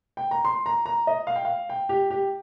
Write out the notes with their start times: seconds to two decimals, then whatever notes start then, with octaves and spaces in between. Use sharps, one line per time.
0.17 G5
0.31 A#5
0.45 C6
0.66 A#5
0.86 A#5
1.07 D#5
1.27 F5
1.36 G5
1.45 F5
1.70 G5
1.89 G4
2.11 G4